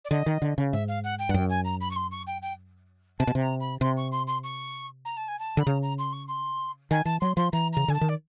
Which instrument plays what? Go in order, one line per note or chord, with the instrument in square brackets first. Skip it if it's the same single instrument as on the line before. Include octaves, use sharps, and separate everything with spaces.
[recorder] D5
[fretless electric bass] D3 [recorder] D#5
[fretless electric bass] D#3
D3
C#3
[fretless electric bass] G#2 [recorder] E5
[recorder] F5
F#5
G5
[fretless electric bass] G2 [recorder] F#5
[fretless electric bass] F#2 [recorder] G5
[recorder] G#5
A#5
B5
C#6
C6
C#6
G5
G5
[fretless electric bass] C3 [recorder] A5
[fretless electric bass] B2
C3
[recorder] A#5
B5
[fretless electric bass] C3 [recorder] C6
[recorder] C#6
C6
C6
C#6
A#5
A5
G#5
A5
[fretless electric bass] D3 [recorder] B5
[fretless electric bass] C#3 [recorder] A#5
[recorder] A#5
C6
C#6
C6
[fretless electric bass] D#3 [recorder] G#5
[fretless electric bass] E3 [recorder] A5
[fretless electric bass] F#3 [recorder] C6
[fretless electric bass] F3 [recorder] C6
[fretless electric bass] E3 [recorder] A#5
[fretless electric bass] C#3 [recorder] A#5
[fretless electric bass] D3 [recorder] G#5
[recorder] A5
[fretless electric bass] D#3
[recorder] D5